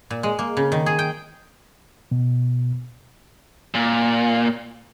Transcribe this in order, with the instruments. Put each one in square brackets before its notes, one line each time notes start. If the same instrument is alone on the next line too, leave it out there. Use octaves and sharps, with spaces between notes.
[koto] A#2
G#3
A#3
C#3
D#3
G#4
G5
[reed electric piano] B2
[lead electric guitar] A#2